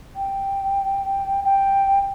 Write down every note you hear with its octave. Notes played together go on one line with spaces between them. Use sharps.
G5
G5